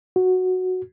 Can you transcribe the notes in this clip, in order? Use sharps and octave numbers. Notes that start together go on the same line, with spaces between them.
F#4